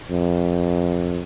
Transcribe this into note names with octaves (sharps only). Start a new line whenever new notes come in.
F2